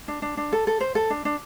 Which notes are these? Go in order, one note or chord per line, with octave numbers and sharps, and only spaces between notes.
D4
D4
D4
A4
A4
C5
A4
D4
D4